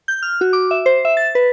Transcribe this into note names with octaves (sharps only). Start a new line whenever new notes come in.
G6
F6
F#4
D6
E5
C5
E5
A6
B4